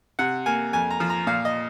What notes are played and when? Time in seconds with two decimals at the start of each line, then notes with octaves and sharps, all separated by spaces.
0.19 C3 F#5
0.46 A#3 G#5
0.73 F2 G#5
0.90 A#5
1.00 F3
1.10 A#5
1.27 A#2 F5
1.45 D#5